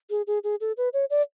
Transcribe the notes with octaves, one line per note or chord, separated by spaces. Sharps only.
G#4
G#4
G#4
A4
B4
C#5
D5